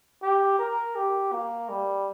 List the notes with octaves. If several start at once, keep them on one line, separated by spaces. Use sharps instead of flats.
G4
A#4
G4
A#3
G3